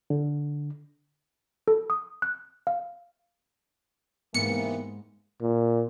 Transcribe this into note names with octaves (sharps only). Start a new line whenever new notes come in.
D3
A4
D#6
F#6
F5
G#2 C3 E3 A#3 B3 C#7
A#2